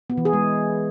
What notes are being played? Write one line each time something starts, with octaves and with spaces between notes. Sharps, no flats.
B3
E3
G#4
G#3